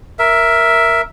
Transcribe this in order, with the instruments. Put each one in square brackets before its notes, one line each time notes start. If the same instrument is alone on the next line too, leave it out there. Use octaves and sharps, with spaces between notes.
[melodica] A#4 E5